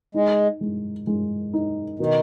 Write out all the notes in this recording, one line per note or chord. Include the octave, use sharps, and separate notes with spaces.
G#3 D#4
G#3
G#3
D#4
B2 D#3